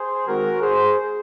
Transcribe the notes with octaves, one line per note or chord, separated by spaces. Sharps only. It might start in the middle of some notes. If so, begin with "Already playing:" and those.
Already playing: G#4 C5
D#3 G#3 C4 F#4 A#4
G#4 C5